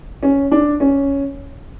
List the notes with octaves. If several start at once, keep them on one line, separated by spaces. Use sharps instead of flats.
C#4
D4
C#4